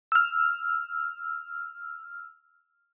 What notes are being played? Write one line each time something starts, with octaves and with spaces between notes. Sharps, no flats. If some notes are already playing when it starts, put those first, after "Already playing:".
E6 F6